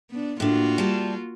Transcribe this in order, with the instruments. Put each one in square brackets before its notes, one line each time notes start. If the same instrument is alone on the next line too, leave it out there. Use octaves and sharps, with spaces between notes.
[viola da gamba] B3 D4
[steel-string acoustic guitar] A2 D4 [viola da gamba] A#3 F4 F#4
[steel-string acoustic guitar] G3 A5